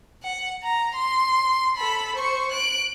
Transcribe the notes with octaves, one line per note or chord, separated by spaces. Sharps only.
F#5
A#5
C6
A4 B5
C5 C#6
F#6 D7